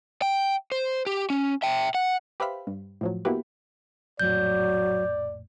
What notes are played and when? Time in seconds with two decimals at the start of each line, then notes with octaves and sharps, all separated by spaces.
0.22 G5
0.72 C5
1.06 G4
1.30 C#4
1.63 E5 G5
1.95 F#5
2.40 G4 B4 C5 E5 F5 B5
2.67 G2
3.01 A2 F3 F#3
3.25 A#3 B3 E4 F#4 G4 B4
4.19 A#1 F2 A2 F#3 D5 G6